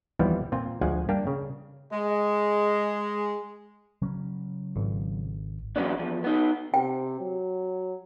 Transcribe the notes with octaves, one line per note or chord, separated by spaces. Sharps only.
D#2 E3 F3 G3 B3
A#2 C4 F4
D2 F3 G#3 F#5 G#5
G3 A#3 D4 G4
C#3
G#3 D#5
C#3 F#3 C#4
G#1
E3 F#3 A3 B3 C#4 D4
E2 F3
B3 D#4
C3 G5
F#3